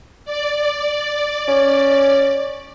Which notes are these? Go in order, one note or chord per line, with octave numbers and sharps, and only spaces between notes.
D5
C#4